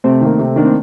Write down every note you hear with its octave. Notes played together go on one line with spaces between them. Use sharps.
C3 A3 C4
D#3 A#3
C3
D#3 A#3 D4
C4